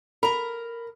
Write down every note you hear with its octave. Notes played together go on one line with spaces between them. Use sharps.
A#4 A#5 B5